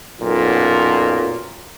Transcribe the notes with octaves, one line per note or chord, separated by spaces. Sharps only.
B1 F#2 A#2